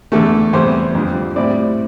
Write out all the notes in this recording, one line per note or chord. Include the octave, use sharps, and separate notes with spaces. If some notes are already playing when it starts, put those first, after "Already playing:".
E2 D3 A3 A4
E2 C3 G3 C5
F2 D3 G3
A2 G3 C4 E4 D5